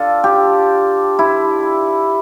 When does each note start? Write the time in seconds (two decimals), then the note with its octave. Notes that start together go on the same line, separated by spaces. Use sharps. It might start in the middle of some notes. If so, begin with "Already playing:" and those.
Already playing: D4 F4 A4
0.24 G4
1.19 E4